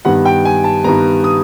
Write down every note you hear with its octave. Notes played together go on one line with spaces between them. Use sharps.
G2 D#3 G3 B3 F#5
G5
G#5
A5
G2 D#3 G3 B3 A#5
D#6